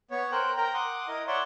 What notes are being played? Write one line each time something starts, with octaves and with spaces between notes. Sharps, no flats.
B3 C#5
A#4 C5 G5 F#6
A#4 G5 A#5
F#5 C6 D6 D#6
E4 A#4 D#5
C#5 D5 E5 F#5 C6 C#6